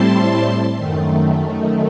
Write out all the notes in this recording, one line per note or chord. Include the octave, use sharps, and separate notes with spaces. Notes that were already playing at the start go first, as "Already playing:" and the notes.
Already playing: A2 G3 C4 E4 A5 C6
F#2 D#3 A3